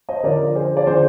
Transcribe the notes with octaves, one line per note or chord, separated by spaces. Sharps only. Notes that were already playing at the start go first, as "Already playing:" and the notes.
C5 D#5
D3 F3 A#4 D5
G#4 C5
D5
D3 F3 G#4 C5